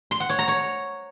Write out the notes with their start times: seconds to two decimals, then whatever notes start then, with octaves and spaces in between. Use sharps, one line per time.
0.11 C6
0.20 F#5
0.29 C#5
0.39 A#5
0.48 C#5